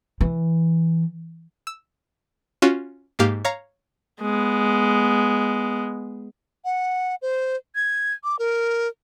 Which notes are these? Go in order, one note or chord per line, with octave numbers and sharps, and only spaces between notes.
E3
E6
C#4 F4 F#4
G#2 A#3 G4 F5
C#5 F5 A#5
G#3 B3
F#5
C5
G#6
D6
A#4